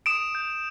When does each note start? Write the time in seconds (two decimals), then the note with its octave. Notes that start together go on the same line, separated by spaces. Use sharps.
0.06 D#6 D7 E7
0.35 G6